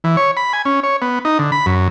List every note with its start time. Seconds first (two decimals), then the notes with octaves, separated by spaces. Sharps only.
0.04 E3
0.17 C#5
0.37 B5
0.53 G#5
0.65 C#4
0.84 C#5
1.02 B3
1.25 D#4
1.39 D3
1.52 B5
1.66 F#2